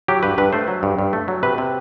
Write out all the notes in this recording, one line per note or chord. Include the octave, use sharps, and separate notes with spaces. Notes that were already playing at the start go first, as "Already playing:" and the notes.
F#3 G4
G2 B4
G2 B4
A3 C5
F#3
G2
G2
A3
F#3
C3 B4
C3